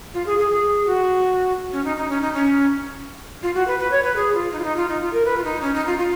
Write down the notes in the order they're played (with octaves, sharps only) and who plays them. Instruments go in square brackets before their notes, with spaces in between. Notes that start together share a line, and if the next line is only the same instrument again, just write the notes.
[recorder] F4
G#4
G#4
G#4
F#4
C#4
D#4
D#4
C#4
D#4
C#4
F4
F#4
B4
B4
C#5
B4
G#4
F4
D#4
F4
D#4
F4
D#4
F4
A#4
B4
F4
D#4
C#4
D#4
F4
F4